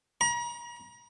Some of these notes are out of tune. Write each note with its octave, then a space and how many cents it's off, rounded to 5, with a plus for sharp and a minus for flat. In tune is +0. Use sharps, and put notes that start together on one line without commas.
A#5 +40